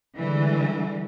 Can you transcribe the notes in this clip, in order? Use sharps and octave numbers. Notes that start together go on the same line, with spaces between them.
D3 E3 G3 G#3